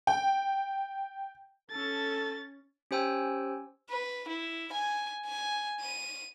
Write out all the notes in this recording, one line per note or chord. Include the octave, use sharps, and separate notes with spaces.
G5
C#4 A4 A6
C#4 G4 C5 G5 G#5 E6
B4
E4
G#5
G#5
D#7